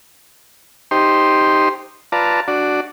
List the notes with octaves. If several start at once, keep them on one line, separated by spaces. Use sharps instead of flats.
D#4 G4 C5 C6
F4 B4 D5 A5 A#5
D4 F#4 D5